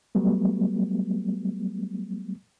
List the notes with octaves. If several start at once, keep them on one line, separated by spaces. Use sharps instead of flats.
F#3 G3 A3 B3